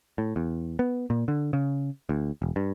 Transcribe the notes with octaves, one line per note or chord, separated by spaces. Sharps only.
A2
E2
B3
A#2
D3
C#3
D2
E1
G2